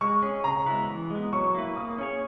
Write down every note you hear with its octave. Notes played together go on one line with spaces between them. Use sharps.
G#3 C#6
C#4 G#4
C#3 A#5
G#3 B3 E4 B4
E3
G#3 B3
F#3 C#6
A#3 E4 B4
A#3 D#6
C#4 G#4 C#5